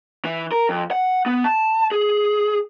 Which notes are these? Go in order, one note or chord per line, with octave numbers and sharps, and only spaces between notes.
E3
A#4
F2
F#5
B3
A5
G#4